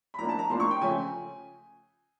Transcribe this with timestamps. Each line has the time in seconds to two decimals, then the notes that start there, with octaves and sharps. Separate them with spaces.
0.14 B5
0.19 A2 F3 A#3 D4 A#5
0.29 A5
0.39 A#5
0.50 A2 F3 A#3 D4 C6
0.60 C#6
0.71 G5
0.81 C#3 F3 A3 C#4 G#5